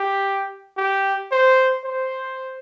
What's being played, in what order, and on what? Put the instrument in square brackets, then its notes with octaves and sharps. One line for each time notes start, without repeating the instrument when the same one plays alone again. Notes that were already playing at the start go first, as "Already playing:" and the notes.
Already playing: [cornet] G4
G4
C5
C5